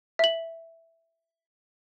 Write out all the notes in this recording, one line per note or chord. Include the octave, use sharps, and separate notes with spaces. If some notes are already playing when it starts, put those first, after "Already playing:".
E5 F#7